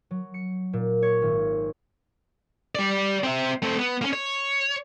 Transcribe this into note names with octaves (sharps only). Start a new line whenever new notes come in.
F#3
C#7
A#2
C#5
G#1
G3 D5
C4 E5
A3 C4
B3
A#3 C#4
C#5